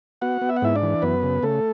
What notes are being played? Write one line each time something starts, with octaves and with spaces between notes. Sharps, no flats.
B3 F#4 F#5
B3
E5
F#5
G#2 E4 E5
D4 D5
E3
F#2 B3 B4
C#3
C#3 A3 A4